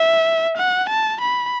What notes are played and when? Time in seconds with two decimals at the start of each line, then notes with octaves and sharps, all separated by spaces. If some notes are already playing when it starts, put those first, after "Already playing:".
Already playing: E5
0.57 F#5
0.89 A5
1.21 B5